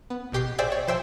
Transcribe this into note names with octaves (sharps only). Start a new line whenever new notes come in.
B3
A1 B2 G4 D6 C7
G#4 C5 D5 E5 G5 G#5
C#5
F3 C5 E5 G5